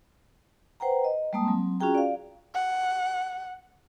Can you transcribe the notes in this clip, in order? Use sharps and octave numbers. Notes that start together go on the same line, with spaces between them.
B4 C5 F#5 G5 A#5
D#5
G3 G#3 A#3 A5 D#6
F#3 C4
C#4 F4 F#4 G#4 G5 A#5
D5 F5
F#5